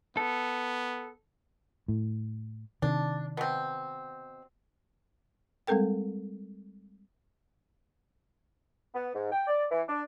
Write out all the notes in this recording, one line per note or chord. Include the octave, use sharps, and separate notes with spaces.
B3 A4
A2
C3 D#3 D4
B2 C4
G3 G#3 C4 A4 A#4 G5
B3
G#2
G5
D5
E3
D4